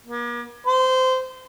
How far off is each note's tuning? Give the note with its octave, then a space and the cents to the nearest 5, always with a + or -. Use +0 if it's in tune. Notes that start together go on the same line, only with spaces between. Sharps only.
A#3 +45
C5 -20